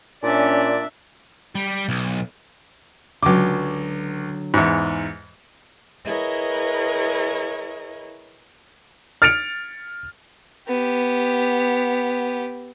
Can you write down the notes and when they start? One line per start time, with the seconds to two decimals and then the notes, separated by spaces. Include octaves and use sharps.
0.23 A#2 C#4 D4 D5 E5
1.55 G3
1.89 B1
3.23 C#2 D3 F#3 D6
4.54 E2 G#2
6.05 E4 G#4 A#4 B4 C#5 D#5
9.22 F6 A6 C#7 D7 F7
10.68 B3 G4